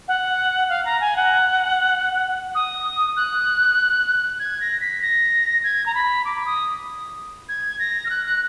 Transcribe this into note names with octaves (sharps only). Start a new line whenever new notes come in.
F#5
F5
A#5
G#5
F#5
D#6
F#6
G#6
A#6
B6
A#6
G#6
A#5
B5
D6
D#6
G#6
A#6
F6
F#6
F#6